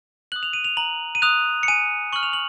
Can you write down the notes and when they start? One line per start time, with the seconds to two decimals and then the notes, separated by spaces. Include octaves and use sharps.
0.32 D#6 F#6 F#7
0.43 F7
0.53 D#7
0.64 F7
0.77 A#5 F#7
1.15 D#7
1.22 D#6 F#6 F7
1.63 C#7
1.68 G#5 D#7
2.13 C#6 F6 F#7
2.23 F7
2.33 F#7